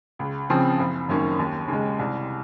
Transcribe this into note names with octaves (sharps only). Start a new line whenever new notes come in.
C#2
C#3 F3 C4
F#1
F#2 D#3 A#3 C#4
D#2
C#3 G#3
C2